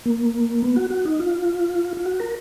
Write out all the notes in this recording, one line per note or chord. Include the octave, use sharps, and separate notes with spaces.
A#3
B3
F#4
F#4
D#4
F4
F4
F#4
A#4